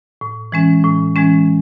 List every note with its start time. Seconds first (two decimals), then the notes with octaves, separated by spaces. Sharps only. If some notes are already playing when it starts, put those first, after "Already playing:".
0.21 A2
0.52 E3 G#3 C#4
0.84 A2
1.16 E3 G#3 C#4